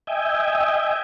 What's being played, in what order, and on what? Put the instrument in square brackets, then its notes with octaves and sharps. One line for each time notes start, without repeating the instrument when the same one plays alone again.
[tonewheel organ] D#5 E5 G5 G#5